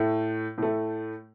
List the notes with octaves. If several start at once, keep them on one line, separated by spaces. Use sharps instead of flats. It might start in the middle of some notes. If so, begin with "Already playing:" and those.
Already playing: A2 A3
A2 A3